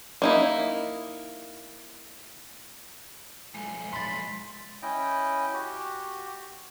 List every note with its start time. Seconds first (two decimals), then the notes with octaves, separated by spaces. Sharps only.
0.22 A#3 D#4 E4
3.54 B1 F2 G#3
3.93 B5 C6 A6
4.82 C#4 E4 D#5 G5
5.54 F#4 G4